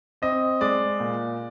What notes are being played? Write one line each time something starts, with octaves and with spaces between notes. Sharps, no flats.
C4 D#5
G#3 D5
A#2